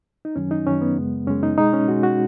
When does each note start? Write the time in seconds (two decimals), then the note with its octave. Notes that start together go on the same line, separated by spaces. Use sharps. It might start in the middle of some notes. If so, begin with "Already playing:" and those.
0.25 D#4
0.36 F#2 D#3 F#3 C#4
0.51 D#4
0.66 F#2 D#3 F#3 C#4
0.82 B3
0.97 F#2 C#3 G#3
1.27 F#2 C#3 G#3 C#4
1.43 D#4
1.58 B2 G#3 D#4
1.74 C#4
1.88 B2 G#3 F#4
2.03 F#4